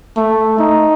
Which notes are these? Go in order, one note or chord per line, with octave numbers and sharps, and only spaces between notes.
A3
D#4